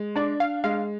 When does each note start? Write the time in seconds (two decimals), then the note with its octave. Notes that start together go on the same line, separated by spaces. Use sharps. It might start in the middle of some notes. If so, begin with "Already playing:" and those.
Already playing: G#3
0.16 D4 D5
0.40 F5
0.64 G#3 F5